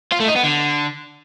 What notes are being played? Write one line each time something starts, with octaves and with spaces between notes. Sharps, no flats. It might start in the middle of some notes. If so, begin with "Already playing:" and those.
F4
A3
D#4
B3
D3